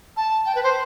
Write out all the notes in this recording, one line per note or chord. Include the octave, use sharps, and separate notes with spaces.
A5
G5
B4
C5